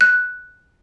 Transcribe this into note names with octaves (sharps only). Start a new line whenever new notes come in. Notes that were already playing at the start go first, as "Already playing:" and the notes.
F#6